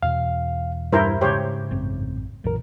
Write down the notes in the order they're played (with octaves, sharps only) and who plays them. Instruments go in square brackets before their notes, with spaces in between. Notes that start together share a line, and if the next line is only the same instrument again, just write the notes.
[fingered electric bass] E2 B2 E3 [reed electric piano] F5
[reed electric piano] G2 [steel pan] E4 A#4 C5
[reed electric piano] G#2 C#3 [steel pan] G4 C5 C#5
[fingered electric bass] A1 F#2 C4
[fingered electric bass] B1 A#2 E3 [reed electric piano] F#2 A#4